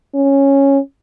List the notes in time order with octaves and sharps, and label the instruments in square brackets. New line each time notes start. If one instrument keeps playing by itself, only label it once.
[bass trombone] C#4